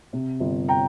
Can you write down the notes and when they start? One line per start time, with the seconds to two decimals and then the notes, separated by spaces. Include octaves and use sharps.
0.13 C3
0.40 G1
0.68 G5 A#5